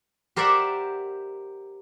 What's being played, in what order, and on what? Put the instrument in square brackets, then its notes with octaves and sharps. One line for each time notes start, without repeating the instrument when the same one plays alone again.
[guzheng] G4 A#4 C5 D5 E5 F#5